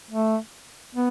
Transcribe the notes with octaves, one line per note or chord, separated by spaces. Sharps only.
A3
B3